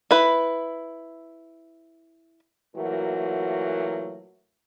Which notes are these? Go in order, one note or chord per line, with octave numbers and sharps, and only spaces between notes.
E4 B4
A#2 E3 F#3 A3 F#4 A#4